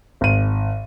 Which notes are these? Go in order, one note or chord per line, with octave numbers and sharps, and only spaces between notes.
G#1 D#7